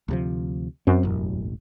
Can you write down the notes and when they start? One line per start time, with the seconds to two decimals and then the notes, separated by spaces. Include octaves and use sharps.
0.08 D2 C3 F3
0.87 F#2 C4
1.03 E1 A1